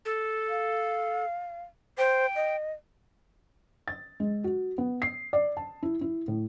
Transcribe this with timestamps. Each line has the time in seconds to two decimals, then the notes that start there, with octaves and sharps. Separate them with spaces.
0.05 A4
0.49 F5
1.98 C5 G5
2.36 D#5
3.88 A6
4.20 G#3
4.44 F#4
4.78 B3
5.02 C7
5.33 D5
5.57 A5
5.83 E4
6.01 E4
6.28 A2